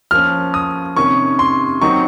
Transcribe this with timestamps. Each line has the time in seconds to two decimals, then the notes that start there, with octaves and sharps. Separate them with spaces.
0.11 F3 A#3 C#4 F6
0.54 D#6
0.96 C3 D#3 A#3 C#4 C#6
1.39 C6
1.81 D#3 F#3 C4 D#4 C#6